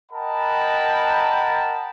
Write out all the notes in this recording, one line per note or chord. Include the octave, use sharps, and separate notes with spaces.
A#4 D#5 F#5 G5 A5 B5